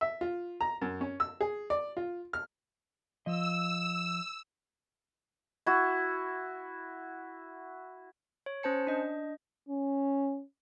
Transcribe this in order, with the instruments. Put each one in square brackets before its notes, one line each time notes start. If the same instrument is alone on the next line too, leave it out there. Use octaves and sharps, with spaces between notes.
[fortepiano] E5
F4
A#5
F#2
C#4
E6
G#4
D5
F4
F6
[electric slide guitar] F3 D#5 [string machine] E6
[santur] E4 F#4
[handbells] C#5
C#4 C5 A5 C#7
D4 D#5
[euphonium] C#4